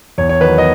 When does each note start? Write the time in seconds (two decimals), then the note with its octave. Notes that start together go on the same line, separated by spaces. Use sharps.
0.18 E2 C#5
0.29 C#5
0.40 D#3 B4
0.45 F#3
0.58 D#5